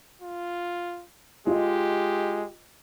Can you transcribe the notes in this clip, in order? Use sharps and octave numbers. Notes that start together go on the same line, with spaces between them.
F4
G#3 F4 G4 D#5